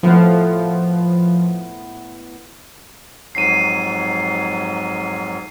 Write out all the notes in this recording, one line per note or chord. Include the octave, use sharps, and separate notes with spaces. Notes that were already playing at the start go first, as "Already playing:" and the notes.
A2 F3 B3 F#5
F2 G#2 F#3 C7 D#7